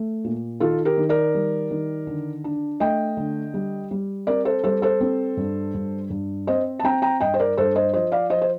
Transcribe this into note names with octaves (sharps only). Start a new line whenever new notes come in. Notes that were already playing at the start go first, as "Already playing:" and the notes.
Already playing: A3
A#2
D#3 F4 A4
G4 A#4
D#3
A#4 D5
G3
D#3
D3
D4
A3 D#5 G5
D3
G3
G3
C4 A#4 D5
A4 C5
G3 A4 C5
A4 C5
C4
G2
G2
G2
C4 C5 D#5
A5
C4 G5 A#5
G5 A#5
G2 D#5 G5
C5
A#4 D5
G2 A4 C5
C5 D#5
F3 C5 D#5
D5 F5
F3 C5 D#5
C5